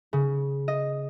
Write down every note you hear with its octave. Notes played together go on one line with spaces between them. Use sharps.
C#3
D#5